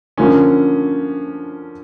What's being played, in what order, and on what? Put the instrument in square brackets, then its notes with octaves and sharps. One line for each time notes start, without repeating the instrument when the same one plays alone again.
[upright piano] D3 F3 A#3 C#4